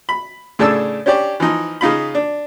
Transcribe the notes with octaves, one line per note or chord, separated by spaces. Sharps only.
B5
A2 C#3 D4 A5 E6
C#4 D4 G4 C#5 D5
E3 F3 D#4
C#3 D#4 F4 B5
D4